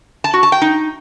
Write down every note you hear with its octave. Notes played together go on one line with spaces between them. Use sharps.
A5
F#4
A5
G5
D#4